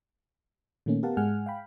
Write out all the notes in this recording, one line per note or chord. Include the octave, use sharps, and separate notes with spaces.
A#2 D#3 A3 A#3 C#4
B3 G4 A#4 F5 F#5 A5
G#2 G#3 F#5 G#5 F6
F5 G5 B5